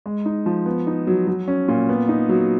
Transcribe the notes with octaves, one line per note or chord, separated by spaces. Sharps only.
G#3
D#4
F3
B3
D#4
F#3
F#3
C#4
A#2
B3
D#4
F#3